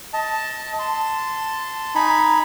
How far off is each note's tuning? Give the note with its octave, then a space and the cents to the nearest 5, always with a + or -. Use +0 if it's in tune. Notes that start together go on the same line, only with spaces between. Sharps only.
D#5 +25 A5 +0
A5 +5 C6 -15
D#4 +0 G#5 +0 B5 +0